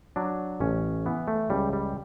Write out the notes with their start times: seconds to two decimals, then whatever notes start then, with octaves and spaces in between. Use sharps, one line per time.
0.16 F#3 D4
0.60 A1 C#4
1.06 E3 B3
1.28 A3
1.50 C#2 G3
1.73 G3